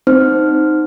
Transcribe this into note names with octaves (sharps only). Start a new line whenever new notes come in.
C4 D#4 C5 F6